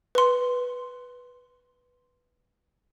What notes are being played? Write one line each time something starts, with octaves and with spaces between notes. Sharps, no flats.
B4 C6